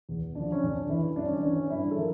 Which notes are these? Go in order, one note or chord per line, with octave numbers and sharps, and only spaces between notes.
E2
D3 F3 D4
C#4
F2 D4
E3 E4
G2 D4
C#4
D4
E3 C#4
G2 E4
A4
F3 A#4